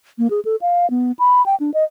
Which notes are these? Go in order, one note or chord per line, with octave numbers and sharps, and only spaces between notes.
A#3
G#4
A4
F5
B3
B5
G5
D4
D#5